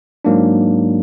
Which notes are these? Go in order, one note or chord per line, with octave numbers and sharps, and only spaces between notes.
G#2 F#3 A#3 D4